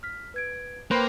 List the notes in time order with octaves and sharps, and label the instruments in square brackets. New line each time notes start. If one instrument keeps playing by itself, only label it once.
[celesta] F6 B6
B4 G#6 D7
[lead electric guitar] A#3 [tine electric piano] B4 C5 [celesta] G5 B5